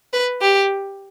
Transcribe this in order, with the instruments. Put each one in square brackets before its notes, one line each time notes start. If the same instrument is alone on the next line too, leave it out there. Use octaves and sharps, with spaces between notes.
[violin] B4
G4